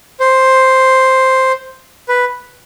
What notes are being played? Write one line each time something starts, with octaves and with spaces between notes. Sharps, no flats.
C5
B4